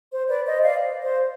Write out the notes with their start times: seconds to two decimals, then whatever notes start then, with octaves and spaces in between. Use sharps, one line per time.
0.11 C5
0.28 B4 D5
0.46 C5 D#5
0.62 D5 F5
1.02 C5